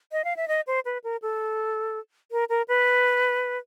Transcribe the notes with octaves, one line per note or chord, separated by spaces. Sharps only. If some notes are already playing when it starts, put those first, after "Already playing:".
D#5
F5
E5
D#5
C5
B4
A#4
A4
A#4
A#4
B4